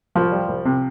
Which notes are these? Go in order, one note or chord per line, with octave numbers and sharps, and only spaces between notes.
C2 F3 F4
G3
C2
C3